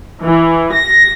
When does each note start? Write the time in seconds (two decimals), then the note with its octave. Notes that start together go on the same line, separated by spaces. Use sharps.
0.24 E3
0.73 A#6